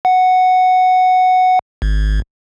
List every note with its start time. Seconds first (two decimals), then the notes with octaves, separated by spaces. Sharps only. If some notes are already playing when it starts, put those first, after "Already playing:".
0.05 F#5
1.82 G#1